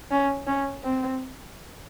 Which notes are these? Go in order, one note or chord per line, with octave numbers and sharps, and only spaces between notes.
C#4
C#4
C4